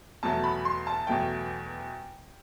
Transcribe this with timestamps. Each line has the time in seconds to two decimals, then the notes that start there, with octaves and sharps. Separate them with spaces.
0.23 E2 B2 F#3 A3 A5
0.44 B5
0.65 C6
0.87 A5
1.07 E2 B2 F#3 A3 G5